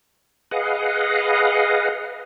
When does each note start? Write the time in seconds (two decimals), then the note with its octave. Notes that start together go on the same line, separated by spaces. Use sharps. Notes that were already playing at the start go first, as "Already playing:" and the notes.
0.51 G#4 B4 D#5 F5 F#5